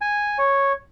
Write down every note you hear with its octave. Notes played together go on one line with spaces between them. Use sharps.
G#5
C#5